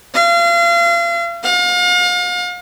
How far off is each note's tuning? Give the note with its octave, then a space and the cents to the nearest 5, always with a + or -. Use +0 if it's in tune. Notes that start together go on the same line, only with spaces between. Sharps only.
F5 -35
F5 +40